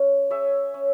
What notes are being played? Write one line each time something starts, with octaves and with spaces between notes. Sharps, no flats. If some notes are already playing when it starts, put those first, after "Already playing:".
Already playing: C#4
G#4 C#5 E5
C#4